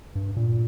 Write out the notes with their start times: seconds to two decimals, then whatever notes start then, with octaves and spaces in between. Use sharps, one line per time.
0.15 G2
0.37 A#2